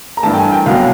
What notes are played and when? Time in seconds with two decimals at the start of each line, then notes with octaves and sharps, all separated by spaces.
0.17 A#5
0.23 G2 E3 A3 A5
0.33 G5
0.38 G#5
0.52 G5
0.66 C2 B2 F#3 F5